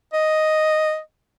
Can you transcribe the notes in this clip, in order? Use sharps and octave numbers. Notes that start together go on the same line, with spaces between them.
D#5